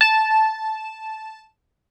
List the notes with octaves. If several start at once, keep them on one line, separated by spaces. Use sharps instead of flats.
A5 E7